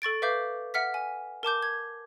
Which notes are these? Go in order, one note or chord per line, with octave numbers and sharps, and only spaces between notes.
A4 C#6 A6 D7
B4 E5 F5 D6 G6
E5 F#5 F6 B6
G#5
A#4 A5 D6 G6
G#6